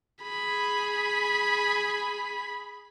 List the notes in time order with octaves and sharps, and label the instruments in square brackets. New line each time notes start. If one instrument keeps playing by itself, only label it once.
[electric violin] G#4 B5